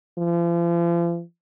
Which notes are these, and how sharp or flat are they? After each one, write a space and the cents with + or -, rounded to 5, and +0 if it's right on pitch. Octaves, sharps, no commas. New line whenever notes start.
F3 -40